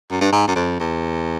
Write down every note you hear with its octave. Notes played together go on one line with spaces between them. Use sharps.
F#2
G2
G#2
F#2
F2
E2